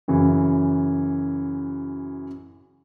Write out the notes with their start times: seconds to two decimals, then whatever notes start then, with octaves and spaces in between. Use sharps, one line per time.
0.08 F#2 C#3 E3